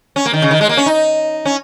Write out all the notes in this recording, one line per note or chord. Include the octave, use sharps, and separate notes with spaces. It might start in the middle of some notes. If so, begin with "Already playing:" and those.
C#4
A#3
D#3
C#3
D#3
G#3
A#3
C#4
D#4
C#4